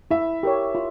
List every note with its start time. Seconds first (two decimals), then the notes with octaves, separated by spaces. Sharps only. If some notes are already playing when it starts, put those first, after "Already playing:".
0.11 E4 E5
0.43 G4 A#4 C#5
0.75 F4